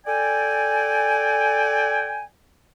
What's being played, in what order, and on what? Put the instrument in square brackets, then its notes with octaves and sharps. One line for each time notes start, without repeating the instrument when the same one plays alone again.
[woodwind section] A4 D5 G5 G#5